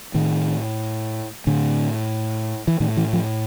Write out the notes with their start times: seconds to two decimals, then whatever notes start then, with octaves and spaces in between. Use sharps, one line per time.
0.14 A2 D#3
1.47 A2 D3
2.68 E3
2.80 A2 D#3
2.97 E3
3.13 F3